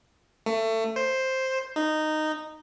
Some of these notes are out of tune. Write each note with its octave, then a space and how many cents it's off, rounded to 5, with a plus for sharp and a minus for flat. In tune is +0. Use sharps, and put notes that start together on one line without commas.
A3 +25
C5 +5
D#4 -10